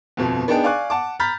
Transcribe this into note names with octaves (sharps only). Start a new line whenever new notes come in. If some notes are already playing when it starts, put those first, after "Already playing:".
G1 F2 B2
B3 D4 D#4 G#4 G5 A5
D5 F5 G#5 C#6 D6 F#6
F#5 A5 D6
A#5 B5 F6 G6 A6 B6